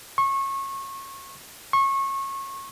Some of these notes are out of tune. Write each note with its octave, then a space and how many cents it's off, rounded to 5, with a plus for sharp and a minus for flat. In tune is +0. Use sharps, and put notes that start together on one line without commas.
C#6 -25
C#6 -25